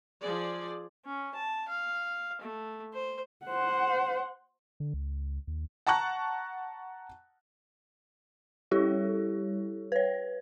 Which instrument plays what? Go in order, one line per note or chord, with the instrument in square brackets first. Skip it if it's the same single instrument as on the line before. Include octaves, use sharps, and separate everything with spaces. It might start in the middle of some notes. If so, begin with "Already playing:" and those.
[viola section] F3 G#4 D5
[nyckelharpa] C#4
A5
F5
A3
C5
[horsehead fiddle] C5 F#5
[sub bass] D3
C#2
D#2
[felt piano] F#5 A5 A#5 C#6 F#6
[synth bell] G3 E4 G4 A4 C#5
B4 C#5